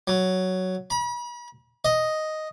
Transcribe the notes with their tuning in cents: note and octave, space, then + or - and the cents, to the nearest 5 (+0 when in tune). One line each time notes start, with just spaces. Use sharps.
F#3 +5
B5 -40
D#5 +0